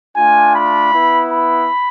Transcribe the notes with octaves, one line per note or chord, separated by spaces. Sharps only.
A3 D4 F4 G#5
B5
B3 E4
B5